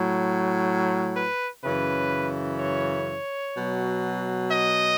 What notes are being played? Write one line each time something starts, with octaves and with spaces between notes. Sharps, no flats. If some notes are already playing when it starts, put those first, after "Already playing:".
Already playing: A2 F#3
B4
F#2 C#3 E3 B4
C#5
B2 F#3
D#5